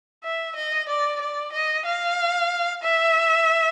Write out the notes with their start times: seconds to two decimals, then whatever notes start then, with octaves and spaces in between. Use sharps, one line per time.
0.24 E5
0.56 D#5
0.89 D5
1.21 D5
1.53 D#5
1.86 F5
2.83 E5